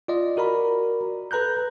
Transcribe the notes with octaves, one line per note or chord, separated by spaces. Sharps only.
F4 D5 D#5
F#4 A#4 D5 A#5 B5
A4 B4 A#5 F#6 G6